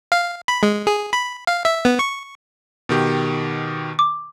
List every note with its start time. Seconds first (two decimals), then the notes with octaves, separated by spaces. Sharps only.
0.12 F5
0.48 B5
0.63 G#3
0.87 G#4
1.13 B5
1.47 F5
1.65 E5
1.85 B3
1.99 C#6
2.89 B2 D#3 G4
3.99 D6